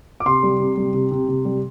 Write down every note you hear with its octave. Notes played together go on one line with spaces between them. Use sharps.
D6
C3 C6
G3
C3
G3
C3
C3
C3
G3